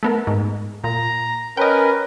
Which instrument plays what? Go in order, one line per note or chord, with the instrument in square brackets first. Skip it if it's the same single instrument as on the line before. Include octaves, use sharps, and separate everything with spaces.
[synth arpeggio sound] A3 B3 A#4
G#2
[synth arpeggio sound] A#2 [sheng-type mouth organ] A#5
[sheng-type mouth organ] C#4 A#4 B4 [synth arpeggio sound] D#5 G5